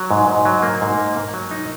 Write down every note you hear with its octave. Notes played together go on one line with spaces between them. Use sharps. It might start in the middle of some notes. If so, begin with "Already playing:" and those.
Already playing: F#3
G#2
G#2
F#3
A#3
G#2
A#3
A#3
F#3
D#4